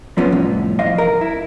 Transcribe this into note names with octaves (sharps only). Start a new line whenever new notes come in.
F#2 F3 B3 C#4
C2 F2 A2
E2 F3 D#5 F5
A#4
E4